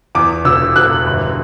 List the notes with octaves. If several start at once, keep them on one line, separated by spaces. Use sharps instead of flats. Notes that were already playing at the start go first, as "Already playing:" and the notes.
E2 D6
E1 E6
E1 F#6
G1